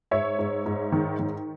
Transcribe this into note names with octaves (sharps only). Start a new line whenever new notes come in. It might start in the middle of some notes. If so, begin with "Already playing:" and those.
G#2 C#5 E5
G#2
G#2
D#3
D#3